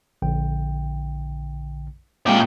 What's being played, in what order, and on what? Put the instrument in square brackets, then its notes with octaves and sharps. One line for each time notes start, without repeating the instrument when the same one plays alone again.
[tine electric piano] A#1 D3 G5
[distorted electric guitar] A#2 G5 [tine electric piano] G#3 C4 D6